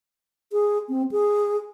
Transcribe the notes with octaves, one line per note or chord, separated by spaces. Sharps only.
G#4
C4
G#4